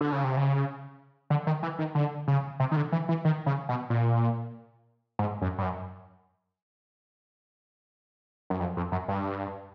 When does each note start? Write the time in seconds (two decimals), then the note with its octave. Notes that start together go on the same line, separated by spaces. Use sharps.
0.01 D3
0.12 C#3
0.24 C3
0.37 C#3
1.30 D3
1.47 D#3
1.63 E3
1.79 D#3
1.95 D3
2.28 C#3
2.60 C3
2.71 D#3
2.76 D3
2.92 E3
3.09 E3
3.25 D#3
3.46 C#3
3.69 B2
3.90 A#2
5.19 G#2
5.41 F#2
5.58 G2
5.62 F#2
8.50 F#2
8.60 F2
8.77 F2
8.92 F#2
9.08 G2